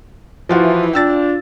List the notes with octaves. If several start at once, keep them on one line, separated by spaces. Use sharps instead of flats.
E3 F3 F4 F#4
D4 F4 G5 E6 A6